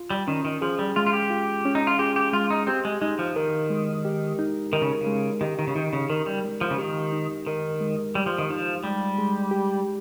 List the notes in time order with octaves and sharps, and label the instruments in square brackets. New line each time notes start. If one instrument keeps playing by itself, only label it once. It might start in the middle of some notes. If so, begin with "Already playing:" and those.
Already playing: [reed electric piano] F4
[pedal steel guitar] G3
[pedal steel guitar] D#3 [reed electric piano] C#4
[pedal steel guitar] D#3
[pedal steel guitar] F3 [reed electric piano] G#4
[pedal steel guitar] G3
[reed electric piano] G#3 [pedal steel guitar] F4
[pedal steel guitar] F4
G4
[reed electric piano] F4
C#4
[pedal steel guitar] D#4
F4
[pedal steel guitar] G4 [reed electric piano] G#4
[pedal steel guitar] G4
[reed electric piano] G#3 [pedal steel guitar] F4
[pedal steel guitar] D#4
[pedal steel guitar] C4 [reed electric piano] G4
[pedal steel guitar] G#3
[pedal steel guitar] G#3 [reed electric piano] D#4
[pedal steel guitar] F3
[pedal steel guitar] D#3 [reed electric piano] A#4
[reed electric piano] G#3
G4
D#4
[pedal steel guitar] D#3 [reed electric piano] A#4
[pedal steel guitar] C#3
C#3
[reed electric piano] G#3
[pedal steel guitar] D#3 [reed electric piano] G4
[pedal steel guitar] D#3
C#3
[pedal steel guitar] D#3 [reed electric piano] D#4
[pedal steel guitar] C#3
[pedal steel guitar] D#3 [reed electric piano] A#4
[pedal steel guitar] G3
[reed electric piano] G#3
[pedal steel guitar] F3
C#3
[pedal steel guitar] D#3 [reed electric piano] G4
[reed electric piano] D#4
[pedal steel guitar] D#3 [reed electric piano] A#4
[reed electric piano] G#3
[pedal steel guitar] G3 [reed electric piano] G4
[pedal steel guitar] F3
D#3
[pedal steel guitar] F3 [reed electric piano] D#4
[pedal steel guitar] G3 [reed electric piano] G#3
[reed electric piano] G#3
G4